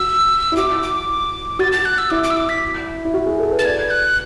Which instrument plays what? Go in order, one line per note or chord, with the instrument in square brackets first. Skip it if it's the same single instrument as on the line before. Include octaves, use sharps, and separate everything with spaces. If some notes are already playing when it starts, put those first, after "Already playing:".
Already playing: [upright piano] F#4 [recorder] E6
[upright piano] E4
[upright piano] F#4 [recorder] D6
[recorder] D6
[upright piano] F#4 [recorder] A6
[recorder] A6
F#6
E6
[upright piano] E4 [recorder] D6
[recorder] D6
E6
D6
B6
[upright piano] E4
F#4
G#4
A4
B4
[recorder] A6
[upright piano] D5 [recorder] G#6
[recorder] F#6